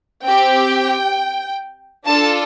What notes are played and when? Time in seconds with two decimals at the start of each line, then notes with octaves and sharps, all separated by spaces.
0.24 C4 G4 G5
2.05 D4 F4 A4 A5